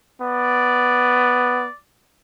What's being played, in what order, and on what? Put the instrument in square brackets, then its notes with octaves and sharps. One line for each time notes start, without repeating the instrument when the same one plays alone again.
[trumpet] B3 [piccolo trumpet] D5